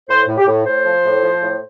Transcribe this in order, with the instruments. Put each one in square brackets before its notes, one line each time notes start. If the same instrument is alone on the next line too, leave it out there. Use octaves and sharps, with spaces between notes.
[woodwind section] A2 C5
A2
G4
A2
A2 C5
F3
A2
F3
A2